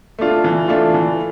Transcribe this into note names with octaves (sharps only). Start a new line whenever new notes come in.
A3 D4 F4
E3
A3 D4 F4
E3